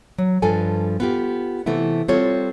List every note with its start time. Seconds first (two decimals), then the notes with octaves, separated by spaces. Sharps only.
0.18 F#3
0.42 G2 F3 A4 G#5
1.00 B3 F4 G4
1.66 C3 E3 A3 B3 E4
2.08 G3 C4 F4 A4 C#5